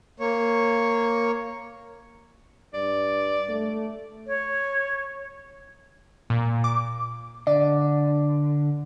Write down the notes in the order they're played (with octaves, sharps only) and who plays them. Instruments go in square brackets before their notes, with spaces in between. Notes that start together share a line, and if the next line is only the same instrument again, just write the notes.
[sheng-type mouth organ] A#3 C#5
[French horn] G2 [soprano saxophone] D5
[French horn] A3
[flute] C#5
[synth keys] A#2
D6
[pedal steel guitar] D3 [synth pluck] D5